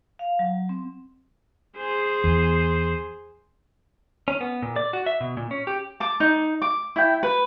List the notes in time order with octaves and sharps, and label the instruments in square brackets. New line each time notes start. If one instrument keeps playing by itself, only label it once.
[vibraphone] F5
F#3
C4
[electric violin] G#4 C5
[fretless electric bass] E2
[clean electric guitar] C#4
B3
A#2
D5
F#4
E5
B2
A#2
C#4
G4
[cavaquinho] A5 D6
D#4
D6
E4 G5
B4